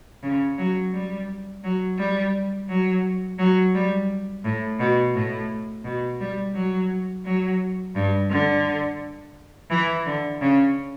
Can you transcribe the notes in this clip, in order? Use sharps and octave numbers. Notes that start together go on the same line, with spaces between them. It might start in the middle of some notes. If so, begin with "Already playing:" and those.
C#3
F#3
G3
F#3
G3
F#3
F#3
G3
A2
B2
A2
B2
G3
F#3
F#3
G2
D3
E3
D3
C#3